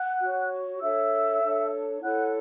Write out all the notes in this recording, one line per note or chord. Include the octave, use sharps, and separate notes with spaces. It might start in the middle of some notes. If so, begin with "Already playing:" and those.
Already playing: F#5 F#6
F#4 C#5
D4 A4 C#5 E5 E6
D4 A4 C#5
E4 A4 C#5 F#5 F#6